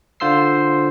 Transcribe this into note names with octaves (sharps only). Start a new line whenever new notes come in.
D3 F4 C5 C6 E6 C7